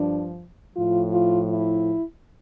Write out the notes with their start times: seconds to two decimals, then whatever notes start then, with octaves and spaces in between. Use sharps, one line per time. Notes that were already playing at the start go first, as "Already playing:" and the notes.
Already playing: G2 F3 D4
0.75 A2 F3 F4
1.13 F4
1.51 E4